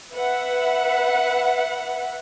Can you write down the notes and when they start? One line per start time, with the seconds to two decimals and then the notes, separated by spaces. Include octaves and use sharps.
0.15 B4 E5 F#5